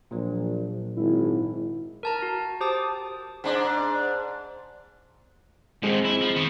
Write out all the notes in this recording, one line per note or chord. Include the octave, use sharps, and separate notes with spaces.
A#1 A#2 F#3
G#1 E4
A#4 A5 A#5
F#4
G4 C5 A5 D6 D#6
G#2 D4
G#2 D#3 G#3 C4
E4
F3
D#3 B3